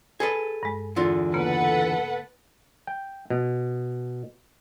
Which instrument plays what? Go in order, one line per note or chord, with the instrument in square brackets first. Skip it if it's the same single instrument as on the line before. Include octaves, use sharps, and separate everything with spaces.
[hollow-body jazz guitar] G#4 A4 B4
[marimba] G2 G#3
[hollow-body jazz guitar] E2 D3 F4
[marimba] C#3 A#3 B3 [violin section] A4 B4 F#5
[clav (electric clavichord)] G5
B2